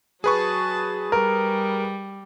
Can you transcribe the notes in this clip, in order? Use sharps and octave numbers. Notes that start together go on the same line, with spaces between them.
F#3 G#4 B4 A5 C#6
G3 A#4